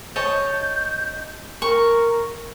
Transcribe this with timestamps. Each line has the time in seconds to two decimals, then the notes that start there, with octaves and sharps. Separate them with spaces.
0.16 C#5 D#5 A5 G6
1.62 A#4 C#6